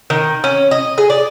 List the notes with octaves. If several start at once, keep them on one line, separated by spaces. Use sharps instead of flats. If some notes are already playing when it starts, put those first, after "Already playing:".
D#3
C#4
D#5
G#4
D5